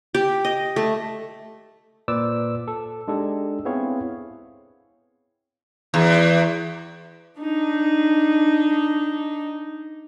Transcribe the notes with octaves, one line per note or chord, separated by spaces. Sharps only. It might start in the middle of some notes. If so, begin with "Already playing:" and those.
G4
D#5
A3
A#2 B4 C5 D5 D6 E6
A4
G#3 D4 D#4 G4 A4
B3 C4 E4 G#4 C#5 F5
E2
D4 D#4